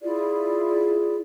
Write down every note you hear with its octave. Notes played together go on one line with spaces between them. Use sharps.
E4 F4 G#4 D5